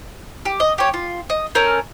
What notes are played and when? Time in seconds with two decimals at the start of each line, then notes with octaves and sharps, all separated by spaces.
0.45 G4
0.60 D#5
0.78 G4 C#5
0.94 F4
1.30 D#5
1.55 C#4 A4 A#4 G6